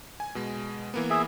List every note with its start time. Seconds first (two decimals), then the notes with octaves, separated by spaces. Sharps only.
0.20 G#5
0.35 B2 G#3
0.94 E3 A#3 B3
1.10 G#4 E5